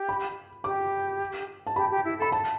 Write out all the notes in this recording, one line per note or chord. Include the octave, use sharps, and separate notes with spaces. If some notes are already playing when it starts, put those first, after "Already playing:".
Already playing: G4
B5
G4 D6
A5
G4 B5
G4
E4
A4 B5
A5